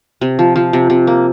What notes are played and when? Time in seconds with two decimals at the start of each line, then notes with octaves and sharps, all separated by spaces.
0.21 C3
0.39 F3
0.56 F3
0.73 C3
0.90 C3
1.07 A#3